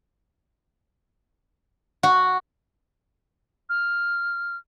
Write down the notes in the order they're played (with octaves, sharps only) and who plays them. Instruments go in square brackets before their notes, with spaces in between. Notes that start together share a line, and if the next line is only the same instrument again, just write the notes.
[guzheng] F#4
[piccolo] F6